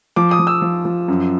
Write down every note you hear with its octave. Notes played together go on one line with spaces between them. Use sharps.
F3 D6
D#6
F3
E6
F3
F3
F#2